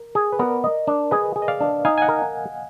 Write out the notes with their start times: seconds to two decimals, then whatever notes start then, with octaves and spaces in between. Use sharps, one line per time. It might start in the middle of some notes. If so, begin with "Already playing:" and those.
Already playing: A#4
0.15 G#4
0.33 B4
0.39 B3 A#4 D5
0.64 D#5
0.87 D4
1.11 G#4 B4 D#5
1.36 G#4
1.42 D#5
1.48 D5 F5
1.60 D4
1.85 D#4 F5 G#5
1.98 G#5
2.02 D#5 F#5
2.08 A#4